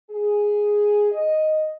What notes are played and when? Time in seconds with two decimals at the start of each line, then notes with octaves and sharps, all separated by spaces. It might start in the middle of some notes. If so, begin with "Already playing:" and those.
0.11 G#4
1.11 D#5